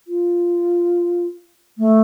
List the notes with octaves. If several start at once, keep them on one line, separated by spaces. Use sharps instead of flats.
F4
A3